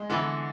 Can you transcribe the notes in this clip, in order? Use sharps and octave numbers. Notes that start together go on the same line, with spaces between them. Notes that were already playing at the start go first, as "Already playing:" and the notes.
Already playing: G#3
D3 E3 B3 D4 A4